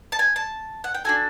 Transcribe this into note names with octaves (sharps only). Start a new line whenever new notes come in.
A5
G#5
A5
F#5
G5
D4 F#4 A4 G#5